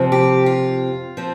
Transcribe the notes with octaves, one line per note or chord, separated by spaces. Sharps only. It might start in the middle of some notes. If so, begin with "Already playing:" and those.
Already playing: F2 C3 F3 C4
G4
F4
F3 C4